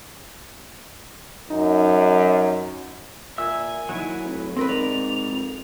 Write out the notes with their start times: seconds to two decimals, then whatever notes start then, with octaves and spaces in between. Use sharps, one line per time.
1.50 F#2 D#4
3.38 A#2 E5 G#5 E6
3.89 D#2 F#3 E4
4.24 F1
4.57 C4 A#4 B4
4.69 G#2 D5 F7
5.31 F2